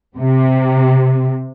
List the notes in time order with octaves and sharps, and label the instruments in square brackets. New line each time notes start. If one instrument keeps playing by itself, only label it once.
[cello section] C3